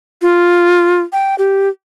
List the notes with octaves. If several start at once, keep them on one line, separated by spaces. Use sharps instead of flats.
F4
G5
G4